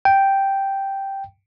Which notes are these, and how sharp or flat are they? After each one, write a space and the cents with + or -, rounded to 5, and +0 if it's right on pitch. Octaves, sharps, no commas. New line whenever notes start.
G5 -5